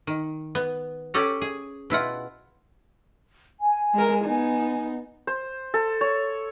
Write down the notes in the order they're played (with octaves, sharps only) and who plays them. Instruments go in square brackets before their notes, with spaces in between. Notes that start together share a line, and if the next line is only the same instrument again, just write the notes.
[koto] D#3
B3
C#4 G4 A4 D5 A#5
G#4
B2 E4 F4 F#5
[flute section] G#5
[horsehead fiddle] G#3 A#4
B3 D#4
[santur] C5
A4
C#5